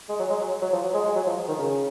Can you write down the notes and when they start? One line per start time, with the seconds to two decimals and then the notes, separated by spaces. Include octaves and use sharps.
0.09 G#3
0.19 F#3
0.30 G#3
0.40 F#3
0.62 F#3
0.73 F3
0.83 F#3
0.94 G#3
1.05 G#3
1.16 F#3
1.27 F3
1.48 D#3
1.58 C#3